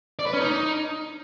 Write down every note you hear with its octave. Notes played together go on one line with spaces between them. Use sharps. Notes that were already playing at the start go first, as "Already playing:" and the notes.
D5
B4
C#4
D#4